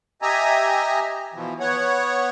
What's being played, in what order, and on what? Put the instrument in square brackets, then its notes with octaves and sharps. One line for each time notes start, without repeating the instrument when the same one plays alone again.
[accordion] G4 D#5 E5 G#5 A#5
B2 E3 F3
B3 C#5 F#5